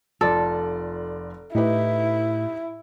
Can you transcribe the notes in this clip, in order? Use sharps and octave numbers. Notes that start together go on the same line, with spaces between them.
F1 F4 A4 D5
A2 D#4 E4 G4 B4